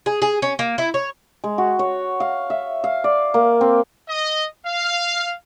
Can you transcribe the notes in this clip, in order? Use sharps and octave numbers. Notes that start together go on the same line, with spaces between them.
G#4
G#4
C#4
A#3
E4
C#5
G#3
F#4
C#5
F5
E5
F5
D5
A#3
C4
D#5
F5